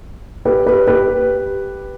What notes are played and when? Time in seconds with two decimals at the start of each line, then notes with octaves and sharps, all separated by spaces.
0.45 G4 B4
0.66 G4 B4
0.87 G4 B4